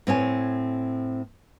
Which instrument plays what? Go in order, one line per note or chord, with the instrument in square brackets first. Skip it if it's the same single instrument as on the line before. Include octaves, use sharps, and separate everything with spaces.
[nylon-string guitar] A2 C4 C#5 G#5